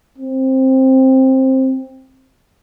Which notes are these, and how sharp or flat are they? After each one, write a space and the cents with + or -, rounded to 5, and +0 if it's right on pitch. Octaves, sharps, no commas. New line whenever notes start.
C4 +10